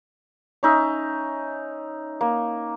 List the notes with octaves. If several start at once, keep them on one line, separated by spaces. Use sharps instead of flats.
C#4 D#4 E5
A#3